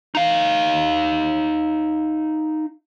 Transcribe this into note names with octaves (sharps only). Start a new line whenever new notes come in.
D#4 F5